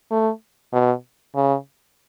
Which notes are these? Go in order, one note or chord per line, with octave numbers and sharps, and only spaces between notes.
A3
B2
C#3